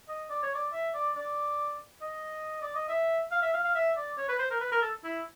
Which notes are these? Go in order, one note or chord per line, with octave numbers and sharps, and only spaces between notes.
D#5
D5
C#5
D5
E5
D5
D5
D#5
D5
D#5
E5
F5
E5
F5
F5
E5
D5
C#5
B4
C5
A#4
B4
A#4
A4
E4